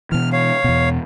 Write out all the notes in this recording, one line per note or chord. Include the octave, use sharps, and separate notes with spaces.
B2 E3 F6
C#5 F5
E2 B2